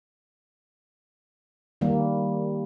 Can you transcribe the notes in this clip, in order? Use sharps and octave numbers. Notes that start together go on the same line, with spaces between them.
D#3 G3 A#3